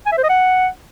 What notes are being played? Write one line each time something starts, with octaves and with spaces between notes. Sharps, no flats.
G#5
E5
C5
D#5
F#5